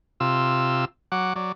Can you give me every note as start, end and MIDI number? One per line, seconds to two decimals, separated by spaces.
0.20 0.85 48
0.20 0.85 65
0.20 0.85 88
1.12 1.33 54
1.12 1.33 78
1.12 1.33 86
1.36 1.52 54
1.36 1.52 74